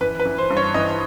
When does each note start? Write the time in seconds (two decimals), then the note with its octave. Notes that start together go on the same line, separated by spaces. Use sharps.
0.01 E3 B4
0.20 B4
0.25 E3
0.38 C5
0.50 G2
0.57 C#5
0.74 E3 D#5